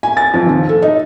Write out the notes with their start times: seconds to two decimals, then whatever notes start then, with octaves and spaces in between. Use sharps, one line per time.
0.03 G#5
0.17 A6
0.34 F2
0.47 D#2
0.69 A4
0.82 D#4